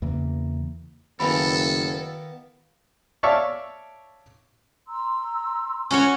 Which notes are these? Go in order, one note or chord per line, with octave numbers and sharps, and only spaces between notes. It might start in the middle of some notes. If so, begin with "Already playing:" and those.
E2 C#3 E3 A#3
F#1 D#3 A#3 B3 E4 A4 G#5 B5
C#5 D5 E5 F5 A5 C#6
A#5 C6 E6
C#4 F#4 C#5